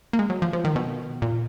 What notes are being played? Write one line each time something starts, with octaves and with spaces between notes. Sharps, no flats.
A#3
G#3
F#3
F3
F3
D#3
B2
A#2